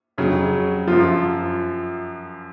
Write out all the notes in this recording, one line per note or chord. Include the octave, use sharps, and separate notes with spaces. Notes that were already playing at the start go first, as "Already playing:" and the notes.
F2 C#3 F#3
F#2 F3 F4